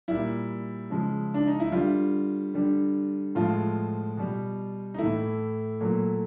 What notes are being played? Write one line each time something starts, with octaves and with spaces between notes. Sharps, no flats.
A#2 G3 E4
C#3 F3 G#3
D4
D#4
E4
D3 G3 F4
D3 G3
A2 F3 G#3 F4
B2 G3
D#4
A2 E3 A3 E4
A#2 F#3 A3